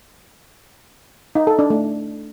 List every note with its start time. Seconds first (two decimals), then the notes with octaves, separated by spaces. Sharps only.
1.35 D#4
1.47 A4
1.59 D4
1.70 A3